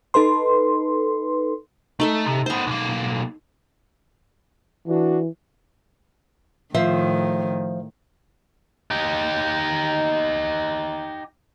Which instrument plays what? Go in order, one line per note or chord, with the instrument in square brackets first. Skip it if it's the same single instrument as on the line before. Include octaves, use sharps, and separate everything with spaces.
[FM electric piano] D#4 A4 B4 C6
[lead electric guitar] A3 [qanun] D#4 A4 E5
[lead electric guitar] C3
[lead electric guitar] B3 C5 [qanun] C6 C#6
[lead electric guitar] B1 A#3
[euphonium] E3 [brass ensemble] D4 F#4
[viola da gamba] A2 D#3 [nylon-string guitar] F3 C5 E5
[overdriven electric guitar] D#4 G4